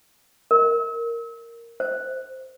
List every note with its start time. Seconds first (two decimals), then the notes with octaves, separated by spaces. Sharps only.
0.51 A#4
1.80 C5